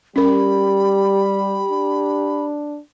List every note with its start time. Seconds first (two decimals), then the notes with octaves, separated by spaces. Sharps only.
0.16 G3 C#4 G4 A#4 B5
1.71 D4